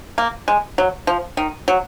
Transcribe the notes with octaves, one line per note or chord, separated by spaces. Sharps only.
A#3
G#3
F#3
F3
D#3
F#3